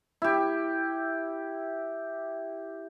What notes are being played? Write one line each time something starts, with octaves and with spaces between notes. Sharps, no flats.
E4 G4